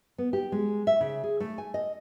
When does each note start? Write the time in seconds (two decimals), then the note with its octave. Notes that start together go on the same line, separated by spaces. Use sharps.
0.18 B3
0.33 G4
0.52 G#3
0.87 E5
1.01 C#3
1.24 G#4
1.40 A3
1.58 G#5
1.74 D#5